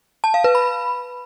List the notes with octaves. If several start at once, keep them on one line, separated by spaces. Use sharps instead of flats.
A5
F5
B4
B5